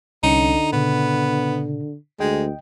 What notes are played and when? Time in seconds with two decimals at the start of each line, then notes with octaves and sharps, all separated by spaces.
0.23 C2 D3 C#4 D#4 C#7
0.73 A#2 C#3 B3
2.20 D2 G#3 D#5 G5